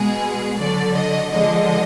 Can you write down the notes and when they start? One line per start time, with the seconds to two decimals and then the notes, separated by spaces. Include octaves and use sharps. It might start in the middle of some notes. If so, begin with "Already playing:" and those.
Already playing: B2 G#3 G#4
0.59 D3 F#3 D5
0.95 D#5
1.31 D3 F3 G#3 D#5